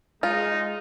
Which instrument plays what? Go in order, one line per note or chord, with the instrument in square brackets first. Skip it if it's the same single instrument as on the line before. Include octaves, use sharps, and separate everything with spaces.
[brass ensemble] G#3 [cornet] D#4 [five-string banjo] F4